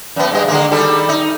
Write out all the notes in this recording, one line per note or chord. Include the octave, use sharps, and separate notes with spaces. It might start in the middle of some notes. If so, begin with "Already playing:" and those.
F#2 B3
G2 G#3 D#5
D3 G#3 A#3
D#3 G3 A4
D#4